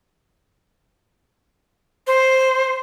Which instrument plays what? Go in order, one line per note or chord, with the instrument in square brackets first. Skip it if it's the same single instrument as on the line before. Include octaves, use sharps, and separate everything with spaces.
[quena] C5